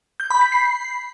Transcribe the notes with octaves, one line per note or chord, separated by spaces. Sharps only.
G6
B5
B6
C7